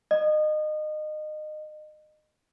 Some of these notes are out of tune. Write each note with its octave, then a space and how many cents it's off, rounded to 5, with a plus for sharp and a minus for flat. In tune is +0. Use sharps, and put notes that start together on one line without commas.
D#5 -25